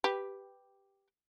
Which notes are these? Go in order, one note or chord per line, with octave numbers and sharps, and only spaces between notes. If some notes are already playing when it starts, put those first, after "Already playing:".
G4 B4